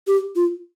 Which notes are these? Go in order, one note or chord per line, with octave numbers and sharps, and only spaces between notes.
G4
F4